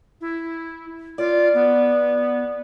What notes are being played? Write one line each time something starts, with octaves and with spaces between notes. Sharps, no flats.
E4
F4 D5
B3